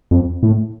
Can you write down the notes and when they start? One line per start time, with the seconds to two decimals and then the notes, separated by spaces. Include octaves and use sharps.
0.11 F2
0.43 A2